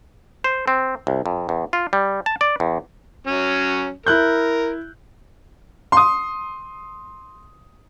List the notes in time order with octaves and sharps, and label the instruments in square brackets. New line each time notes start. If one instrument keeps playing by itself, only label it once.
[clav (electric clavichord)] C5
C4
C2
F2
E2
F4
G3
A5
D5
E2
[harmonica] F#3 C#4
[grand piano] E4 F#6 G6 [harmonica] A#4
[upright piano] C6 D#6